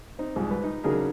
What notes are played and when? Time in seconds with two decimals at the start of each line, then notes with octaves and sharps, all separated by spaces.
0.19 C4 D#4
0.36 C2 G#2 F3 G#3
0.51 B4
0.64 D#4
0.84 C#3 F#3 D4 D#4 G#4 A#4